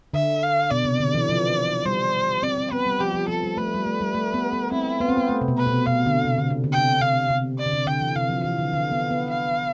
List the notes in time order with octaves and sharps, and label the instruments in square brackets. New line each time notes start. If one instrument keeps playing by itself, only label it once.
[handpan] D3 [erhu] E5
[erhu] F5
[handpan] B2 [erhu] D5
[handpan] C3
D3
E3
F3
[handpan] G3 [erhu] C5
[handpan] C4 [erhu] D5
[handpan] C4
[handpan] B3 [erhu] B4
[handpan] G3
[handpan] F3 [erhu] G4
[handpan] F3
[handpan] F3 [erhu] A4
[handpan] G3
[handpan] A3 [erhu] B4
[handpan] G3
A3
G3
A3
B3
B3
[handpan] C4 [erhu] E4
[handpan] B3 [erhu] F4
[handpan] C4
B3
A3
C3
B2
[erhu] B4
[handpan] B2
[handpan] B2 [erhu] F5
[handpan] D3
C3
D3
C3
D3
[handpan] C3 [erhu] G5
[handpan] C3 [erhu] F5
[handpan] C3
[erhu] D5
[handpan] D3
C3
[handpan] D3 [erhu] G5
[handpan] E3
[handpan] C3 [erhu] F5
[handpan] F3
[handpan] E3 [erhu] F5
[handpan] D3
D3
B3
B3
[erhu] F5